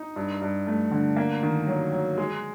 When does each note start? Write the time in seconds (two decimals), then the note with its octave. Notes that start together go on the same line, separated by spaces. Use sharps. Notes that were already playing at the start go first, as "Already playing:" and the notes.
Already playing: D#4
0.16 G2
0.42 G2
0.67 A3
0.91 D3
1.17 A#3
1.43 D#3
1.67 F#3
1.92 F#3
2.18 G#3